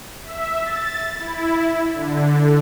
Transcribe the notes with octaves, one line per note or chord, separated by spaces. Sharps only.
E5
A6
E4
D3